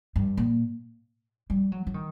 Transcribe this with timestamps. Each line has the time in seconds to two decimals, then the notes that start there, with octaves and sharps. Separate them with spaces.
0.16 G2
0.37 A#2
1.50 G3
1.72 F#3
1.87 F#3
1.94 D#3